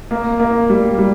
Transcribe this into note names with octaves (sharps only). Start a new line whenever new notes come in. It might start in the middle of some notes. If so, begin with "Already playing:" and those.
A#3
A#3
G3
G3